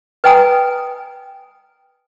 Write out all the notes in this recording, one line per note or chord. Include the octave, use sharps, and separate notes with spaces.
B4 D#5 G5 G#5 A#5 D#6